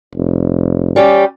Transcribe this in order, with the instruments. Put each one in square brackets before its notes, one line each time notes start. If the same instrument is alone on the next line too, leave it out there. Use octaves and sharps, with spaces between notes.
[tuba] F1
[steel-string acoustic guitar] G3 C#4 G4